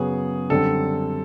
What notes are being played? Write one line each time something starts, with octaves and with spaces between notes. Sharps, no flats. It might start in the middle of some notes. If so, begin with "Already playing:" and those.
Already playing: F#2 C#3 F#3 B3 G#4
F#2 D3 G3 C4 A4